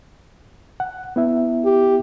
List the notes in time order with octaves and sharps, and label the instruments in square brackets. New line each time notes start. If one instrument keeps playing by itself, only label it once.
[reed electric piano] F#5
B3 E4 E5
[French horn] G4